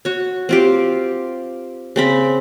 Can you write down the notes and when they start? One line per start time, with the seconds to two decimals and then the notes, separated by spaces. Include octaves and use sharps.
0.05 F#4 C#5
0.49 C4 F4 G4
1.96 C#3 C4 B5